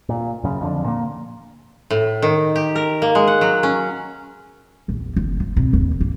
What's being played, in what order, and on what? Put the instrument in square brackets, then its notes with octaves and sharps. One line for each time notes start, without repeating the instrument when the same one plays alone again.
[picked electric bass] A#2
F#2 C#3
F2 D3
A#2 A#3
[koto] A2
D#3
G4
A#4
A#3
G#3
F#5
F#3
C#4
[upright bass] A#1 E2
F#1
F3
B2 C4
D#2 E3
A#3